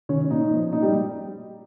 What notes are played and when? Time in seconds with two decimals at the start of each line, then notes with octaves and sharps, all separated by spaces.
0.09 D#3 C#4 C#5
0.30 A#2 D#4 D#5
0.51 F3
0.72 A#2 D#4 D#5
0.82 G3 G4